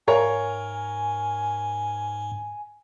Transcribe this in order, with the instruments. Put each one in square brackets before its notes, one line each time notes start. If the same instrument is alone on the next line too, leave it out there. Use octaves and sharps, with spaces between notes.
[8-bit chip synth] G#2 [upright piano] A#4 C#5 F5 [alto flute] G#5